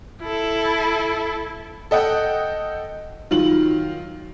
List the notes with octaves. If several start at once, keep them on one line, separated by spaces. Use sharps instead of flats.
E4 A4
A4 D#5 F#5 G5
D#3 F#3 F4 F#7